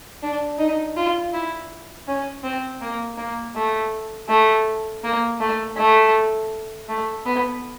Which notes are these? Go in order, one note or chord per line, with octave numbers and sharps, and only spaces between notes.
D4
D#4
F4
E4
C#4
C4
A#3
A#3
A3
A3
A#3
A3
A3
A3
B3